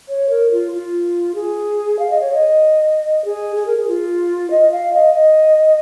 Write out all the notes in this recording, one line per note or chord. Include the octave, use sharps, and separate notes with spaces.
C#5
A#4
F4
F4
G#4
F5
D#5
C#5
D#5
G#4
G#4
A#4
G#4
F4
D#5
F5
D#5
D#5